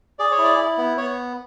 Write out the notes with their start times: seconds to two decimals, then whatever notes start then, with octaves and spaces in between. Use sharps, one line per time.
0.19 G#4 D5
0.31 C#5
0.38 E4
0.44 D5
0.58 E4
0.78 B3
0.97 B3 C#5